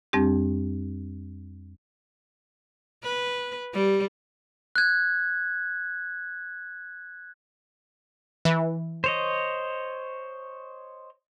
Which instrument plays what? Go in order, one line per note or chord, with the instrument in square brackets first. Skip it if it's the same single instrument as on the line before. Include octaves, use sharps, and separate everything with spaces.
[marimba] F2 G3 C4 D4 G4
[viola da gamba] B4
G3
[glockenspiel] F#6 G#6
[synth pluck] E3
[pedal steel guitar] C5 C#5 D#5